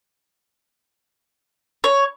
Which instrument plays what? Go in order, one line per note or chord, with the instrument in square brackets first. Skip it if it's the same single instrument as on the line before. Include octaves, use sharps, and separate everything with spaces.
[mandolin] C#5